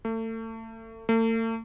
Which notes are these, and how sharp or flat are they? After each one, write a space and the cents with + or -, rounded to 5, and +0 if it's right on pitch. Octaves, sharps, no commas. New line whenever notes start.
A3 +35
A3 +45